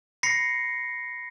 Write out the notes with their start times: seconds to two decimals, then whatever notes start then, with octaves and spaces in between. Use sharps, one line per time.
0.23 B5 A#6 C7 C#7